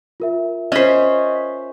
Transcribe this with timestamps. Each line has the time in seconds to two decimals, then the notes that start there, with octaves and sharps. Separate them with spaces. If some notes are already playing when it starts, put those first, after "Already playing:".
0.20 F4 A#4 E5
0.72 C#4 C5 D#5 B6